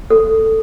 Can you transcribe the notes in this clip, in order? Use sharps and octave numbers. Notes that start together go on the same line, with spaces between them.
A4